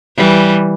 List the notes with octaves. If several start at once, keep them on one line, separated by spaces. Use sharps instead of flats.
E3 G3